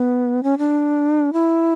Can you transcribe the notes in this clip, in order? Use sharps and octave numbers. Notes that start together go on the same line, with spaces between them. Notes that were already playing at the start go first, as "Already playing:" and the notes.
Already playing: B3
C#4
D4
E4